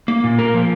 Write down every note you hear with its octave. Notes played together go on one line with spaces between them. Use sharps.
A#3
A#2
A#3 A#4
F3